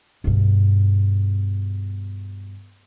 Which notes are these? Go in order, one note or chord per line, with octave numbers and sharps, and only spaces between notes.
G2 B2